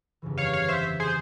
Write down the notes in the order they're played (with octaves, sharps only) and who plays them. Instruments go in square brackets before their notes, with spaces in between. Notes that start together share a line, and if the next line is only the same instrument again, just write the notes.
[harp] G1 F2 C#3 E3
[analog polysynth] C#5 F5
C#5 F5
C5 E5
G#4 C5